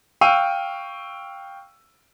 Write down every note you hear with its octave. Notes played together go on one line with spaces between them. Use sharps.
F5 G5 C#6 E6 D7 D#7